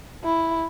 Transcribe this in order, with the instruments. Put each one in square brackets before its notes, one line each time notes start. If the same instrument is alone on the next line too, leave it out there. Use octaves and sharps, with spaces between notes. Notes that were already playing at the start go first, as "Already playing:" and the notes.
[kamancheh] E4